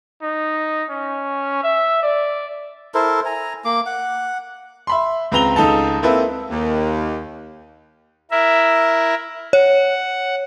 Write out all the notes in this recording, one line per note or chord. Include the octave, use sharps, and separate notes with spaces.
D#4
C#4
E5
D5
E4 A4 A#4 C5
G#5 A#5
A#3 D6
F#5
E5 B5 C6
C#2 C4 B4 A#5 F7 G7
C#2 D#4 A4 A5
A#3 C4 E4 A4 B4
D#2
E4 A#4 E5
C#5 F#5